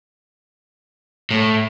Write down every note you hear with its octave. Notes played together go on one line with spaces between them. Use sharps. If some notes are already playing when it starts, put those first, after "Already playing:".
A2